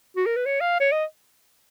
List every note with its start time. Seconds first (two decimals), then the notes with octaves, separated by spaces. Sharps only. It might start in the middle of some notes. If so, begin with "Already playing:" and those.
0.16 F#4
0.26 A#4
0.36 B4
0.46 C#5
0.61 F5
0.80 C#5
0.92 D#5